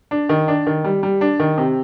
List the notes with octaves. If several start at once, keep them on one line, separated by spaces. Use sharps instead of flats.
D4
D#3
D4
D#3
G3
G3
D4
D#3
C3